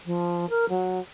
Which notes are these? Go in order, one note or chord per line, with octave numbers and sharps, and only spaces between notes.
F3
A#4
F#3